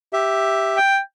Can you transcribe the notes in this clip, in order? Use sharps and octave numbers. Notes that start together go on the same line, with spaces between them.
G4 E5
G5